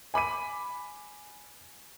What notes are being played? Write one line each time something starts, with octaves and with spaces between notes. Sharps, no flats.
G#5 B5 D6 D#7